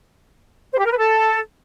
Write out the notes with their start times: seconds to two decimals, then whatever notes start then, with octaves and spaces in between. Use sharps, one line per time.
0.72 C5
0.78 G4
0.85 A#4
0.91 B4
0.98 A4